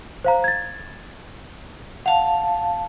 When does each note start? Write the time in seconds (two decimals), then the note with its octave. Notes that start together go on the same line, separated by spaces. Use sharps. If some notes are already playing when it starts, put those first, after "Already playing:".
0.25 C5 F5 A#5
0.44 G#6 A6
2.06 F5 F#5 A5 F7